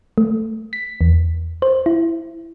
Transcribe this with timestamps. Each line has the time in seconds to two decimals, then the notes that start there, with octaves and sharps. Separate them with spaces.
0.18 A3
0.73 B6
1.01 E2
1.62 C5
1.86 E4